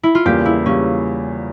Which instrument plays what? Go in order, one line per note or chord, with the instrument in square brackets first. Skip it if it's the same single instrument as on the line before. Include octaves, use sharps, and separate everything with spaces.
[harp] E4
F4
[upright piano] E2 C#3 G3 A#3 [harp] G4
[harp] E4
[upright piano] C#3 G3 A#3 [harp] C#4